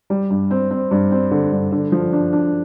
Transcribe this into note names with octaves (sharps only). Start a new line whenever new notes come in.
G3
G2
C4
C4
G2
C4
D3
G2
D3
F3
D4
D4